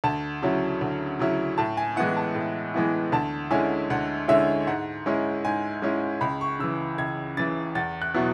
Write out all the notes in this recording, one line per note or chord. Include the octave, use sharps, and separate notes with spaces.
D2 A5
C#3 F#3 C#4 E4
D2
C#3 F#3 C#4 E4
A2 A5
G#5
E3 G#3 B3 E4 F#5
A5
A2
E3 G#3 B3 E4
D2 A5
D3 G#3 C#4 E4 G#5
D2 F#5
D3 G#3 C#4 E4 E5
G#2 F#5
G#3 C#4 E4
G#2 G#5
G#3 C#4 E4
C#2 B5
C#6
C#3 E3 E6
C#2 G#6
C#3 E3 A6
E2 A6
F#6
B2 F#3 B3 E4